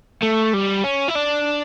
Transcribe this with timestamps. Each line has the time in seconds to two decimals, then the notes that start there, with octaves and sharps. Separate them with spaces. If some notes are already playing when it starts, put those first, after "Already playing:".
0.22 A3
0.53 G3
0.84 C#4
1.08 E4
1.16 D4